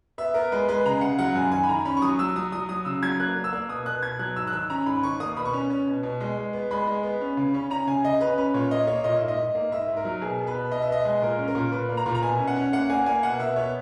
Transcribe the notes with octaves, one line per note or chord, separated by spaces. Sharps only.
B3 E5
B3 A#4
G#3 B4
G#3 B4
C#3 A#5
C#3 F#5
F#3 F#5
F#2 G#5
D#3 G#5
B5
D#3 A#5
C#4 B5
C#6
F#3 D#6
F#3 E6
F#3 D#6
F#3 D#6
F#3 D#6
C#3 E6
F#3 G#6
A#3 F#6
A#3
E6
A#3
B2 D#6
B2 F#6
B2 G#6
F#3 F#6
G#2 E6
F#6
D#3 E6
C#4 A#5
G#2 B5
D#3 C#6
A#3 D#6
B2 B5
C#6
C#4
C#4
B2
B2
G#3
G#3
B3
G#3 B5
G#3
B3
C#4
C#3
C#4
C#4 A#5
C#3 G#5
C#3 D#5
C#4 B4
C#4 B4
A#2 C#5
A#3 D#5
A#3 C#5
A#2 D#5
E5
G#2
D#5
G#2
A#3
G#2 E5
G#2
A#4
F#3
B2 G#4
B3
B4
B2
B2 D#5
E5
B3 D#5
G#3
A#2 A#4
C#4
A#4
A#2
A#2 B4
A#3
A#5
A#2
A#5
B2 G#5
C#4
F#5
C#4
A#3 F#5
A#3 G#5
A#3 G#5
B2 F#5
B2 E5
B3 C#5